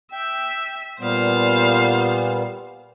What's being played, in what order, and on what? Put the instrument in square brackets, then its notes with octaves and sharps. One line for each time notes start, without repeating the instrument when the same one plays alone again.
[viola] E5 [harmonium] G5
[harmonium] A#2 G3 B3 [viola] C5 F5